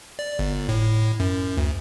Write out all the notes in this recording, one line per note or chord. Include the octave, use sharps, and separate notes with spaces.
D5
G1
A2
F#2
D2